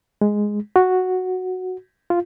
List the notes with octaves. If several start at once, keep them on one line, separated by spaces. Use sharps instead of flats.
G#3
F#4
F4